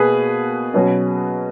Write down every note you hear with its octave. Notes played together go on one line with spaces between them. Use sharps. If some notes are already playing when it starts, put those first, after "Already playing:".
Already playing: B2 A#3 G#4 B4
B2 F#3 C#4 F#4